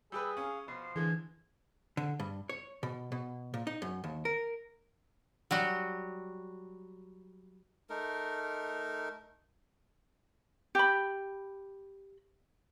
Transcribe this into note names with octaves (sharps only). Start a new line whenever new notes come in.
G3 G4 G#4 B4 E6
C#4 F5
B2 F3 C7
D3 E3 G#3 G#6
D3
G2
C#5
B2
B2
A#2
D#4
F#2
D#2
A#4
F#3 G3 F#4
A3 D#4 A#4
G4 B5